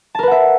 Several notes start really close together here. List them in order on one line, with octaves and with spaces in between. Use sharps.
A5 A#4 B4 F#5 E5